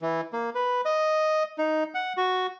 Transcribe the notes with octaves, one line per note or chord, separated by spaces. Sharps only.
E3
A#3
B4
D#5
D#4
F#5
F#4